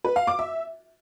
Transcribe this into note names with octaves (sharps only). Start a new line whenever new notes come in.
B4
F5
D6
E5